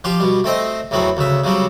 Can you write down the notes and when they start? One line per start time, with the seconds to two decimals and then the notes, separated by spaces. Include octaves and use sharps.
0.04 F3 F4 G4
0.20 B2 G3
0.44 A3 C4 C5 D#5
0.91 E2 A2 F#3 B3 C4
1.17 D2 C#3 E5
1.44 C#3 F#3 G3 C4